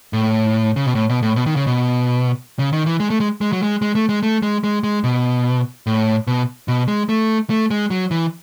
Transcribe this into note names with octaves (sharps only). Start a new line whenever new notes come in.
A2
C#3
B2
A2
B2
A2
B2
D#3
C#3
B2
C#3
D#3
E3
G#3
A3
G#3
G#3
F#3
G#3
G#3
A3
G#3
A3
G#3
G#3
G#3
B2
A2
B2
B2
G#3
A3
A3
G#3
F#3
E3